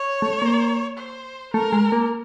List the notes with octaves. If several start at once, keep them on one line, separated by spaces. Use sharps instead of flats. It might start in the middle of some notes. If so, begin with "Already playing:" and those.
Already playing: C#5
A3
A#3
C5
A3 A#4
G#3
A#3